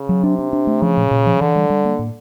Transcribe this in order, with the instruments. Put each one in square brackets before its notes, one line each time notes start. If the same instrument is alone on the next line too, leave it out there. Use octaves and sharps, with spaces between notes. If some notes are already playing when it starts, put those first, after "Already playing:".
Already playing: [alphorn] C#3
[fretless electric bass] F#3
[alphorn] C3 [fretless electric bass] D4
[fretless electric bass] D4
D4
A3
[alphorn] C#3 [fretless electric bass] F3
[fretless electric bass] A#2
A#2
F3
[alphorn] D3 [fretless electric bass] E3
[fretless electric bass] G3
G3
A#3
A2